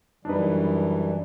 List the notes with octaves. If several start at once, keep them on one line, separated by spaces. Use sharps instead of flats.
F#2 E3 G3 D4 D#4 B4